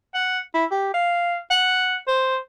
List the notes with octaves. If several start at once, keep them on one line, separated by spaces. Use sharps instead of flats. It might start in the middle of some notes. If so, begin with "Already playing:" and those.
F#5
E4
G4
F5
F#5
C5